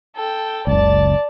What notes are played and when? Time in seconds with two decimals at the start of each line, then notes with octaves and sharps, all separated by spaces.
0.16 A4 G5
0.67 F#1 C#2 D5 A5